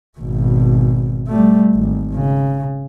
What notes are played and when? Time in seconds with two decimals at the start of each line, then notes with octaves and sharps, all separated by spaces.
0.18 G#1 B2
1.28 G3 A3
1.76 G#1
2.14 C#3